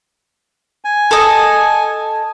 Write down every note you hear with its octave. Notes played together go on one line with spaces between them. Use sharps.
G#5
A4 D#5